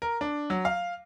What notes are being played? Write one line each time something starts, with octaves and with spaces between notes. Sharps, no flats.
A#4
D4
F#3
F5